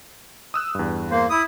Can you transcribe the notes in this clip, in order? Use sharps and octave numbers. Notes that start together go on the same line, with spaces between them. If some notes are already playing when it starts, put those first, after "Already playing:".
D#6 E6 F#6
E2 G2
A#3 C5
E4 D#6